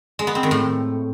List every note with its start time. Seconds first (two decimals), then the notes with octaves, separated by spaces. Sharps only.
0.19 G#3
0.27 B3
0.35 C4
0.43 D#3
0.51 A2